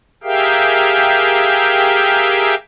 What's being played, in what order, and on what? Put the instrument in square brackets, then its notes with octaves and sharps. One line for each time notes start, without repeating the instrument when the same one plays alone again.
[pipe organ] G4 G#4 A#4 E5 F5 G5